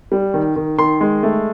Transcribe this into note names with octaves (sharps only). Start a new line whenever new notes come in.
G3
D#3
D#3
D#3 C6
G#3
A3